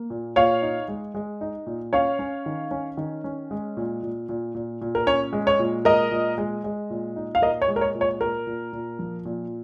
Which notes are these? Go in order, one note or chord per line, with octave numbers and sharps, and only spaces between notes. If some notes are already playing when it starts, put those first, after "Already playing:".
Already playing: A#3
A#2
A#2 C#5 F5
D#4
G#3
G#3
D#4
A#2
C#4 C#5 F5
C#4
D#3
C#4
D#3
C#4
G#3
A#2
A#2
A#2
A#2
A#2
A#4
C#4 C#5
G#3
C#5
A#2
G#3 A#4 D#5
A#2
G#3
G#3
A#2
D#4
F5
A#2 A#4 D#5
C#5
G#3
A#4
C#5
A#2
C#5
A#2 A#4
A#2
A#2
F3
A#2